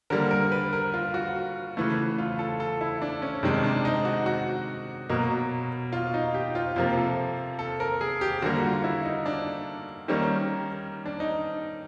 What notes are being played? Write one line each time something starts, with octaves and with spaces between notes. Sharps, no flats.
D3 G3 A#3 A#4
A#4
B4
A#4
F4
F#4
C#3 E3 A3
F4
A4
A4
E4
D4
C#4
C3 D#3 G#3 D4
D4
D#4
F#4
F#4
B2 F#3 A#3
F4
D#4
G4
F4
C3 F3 A#3 F4
A4
A4
A#4
G#4
G4
D3 G3 A#3 F#4
F4
E4
D#4
D4
D#3 G3 A#3 C#4
D4
D#4